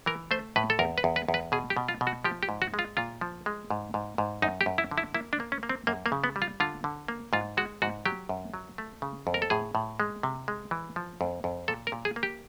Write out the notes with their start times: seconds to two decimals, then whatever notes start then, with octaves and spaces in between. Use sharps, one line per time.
0.06 E3 A#4
0.31 A3 C5
0.56 A2 B4
0.70 A4
0.79 E2 A#4
0.98 B4
1.04 E2
1.16 B4
1.29 E2
1.34 B4
1.52 B2 G#4
1.70 G4
1.77 B2
1.88 F4
2.01 B2
2.07 F#4
2.24 F3 G4
2.43 G4
2.49 G#2
2.62 F#4
2.74 G#3
2.79 F4
2.97 A#2 F4
3.21 F3
3.46 G#3
3.71 G#2
3.94 G#2
4.18 G#2
4.42 F#2 D#4
4.61 G4
4.66 F#2
4.78 E4
4.91 D3
4.98 E4
5.14 A#3 E4
5.33 D4
5.40 A#3
5.52 C#4
5.63 A#3
5.69 C4
5.87 F#2 A#3
6.06 A#3
6.12 C#3
6.24 B3
6.36 G3
6.42 F4
6.60 D3 F4
6.84 D3
7.08 A#3
7.33 G#2 F4
7.57 G#3 F#4
7.82 G#2 F#4
8.06 F#3 G4
8.29 F#2
8.54 F#3
8.78 A3
9.02 C#3
9.27 F2
9.34 A#4
9.42 A4
9.50 A2 G#4
9.75 A2
10.00 G#3
10.23 C3
10.48 G#3
10.71 E3
10.96 F3
11.21 F2
11.44 F2
11.68 A#2 A4
11.87 A#4
11.92 A#2
12.05 G#4
12.16 A#3
12.23 G4